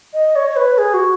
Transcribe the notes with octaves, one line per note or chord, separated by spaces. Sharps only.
D#5
C#5
C#5
B4
G#4
F#4